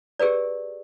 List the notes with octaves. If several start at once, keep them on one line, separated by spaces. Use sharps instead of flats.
G4 G#4 A#4 B4 D5